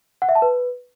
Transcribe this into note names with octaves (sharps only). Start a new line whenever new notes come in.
F#5
E5
A5
B4